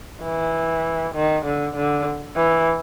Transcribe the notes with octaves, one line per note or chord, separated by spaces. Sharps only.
E3
D#3
D3
D3
E3